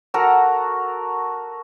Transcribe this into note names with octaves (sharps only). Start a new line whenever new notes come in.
F#4 A4 A#4 A#5